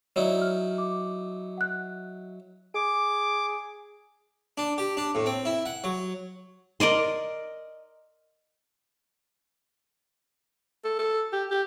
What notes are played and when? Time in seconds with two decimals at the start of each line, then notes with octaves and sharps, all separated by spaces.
0.16 F#3 D#4 E4 C#5 D5
0.42 F6
0.78 D6
1.58 F#5 F#6
2.74 G#4 D6
4.58 D4
4.78 G4
4.97 D4
5.15 A2
5.26 C4
5.45 E4
5.66 F#5
5.84 F#3
6.80 A#4 D5 D#5 C6
10.85 A4
10.99 A4
11.33 G4
11.51 G4